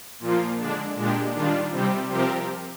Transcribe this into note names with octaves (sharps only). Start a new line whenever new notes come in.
A#2 F3 A#3 F4
D3 G#3 D4
A#2 G#3 D4 G4
D#3 G3 D4 F4
C3 G3 C4 G4
C3 F3 C4 G4 A#4